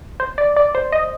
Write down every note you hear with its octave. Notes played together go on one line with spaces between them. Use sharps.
C5
D5
D5
C5
D#5